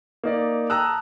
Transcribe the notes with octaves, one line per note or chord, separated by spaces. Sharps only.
A#3 D#4 D5
G5 A5 A#5 D#6 E6 F#6